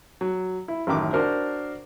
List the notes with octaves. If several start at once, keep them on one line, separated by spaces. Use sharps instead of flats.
F#3
E4
A1 F#2 D#3 D6
D4 F#4 A#4 C5